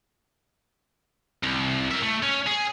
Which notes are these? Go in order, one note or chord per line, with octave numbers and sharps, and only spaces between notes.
C2
A#4 E5
A3
C#4
G#4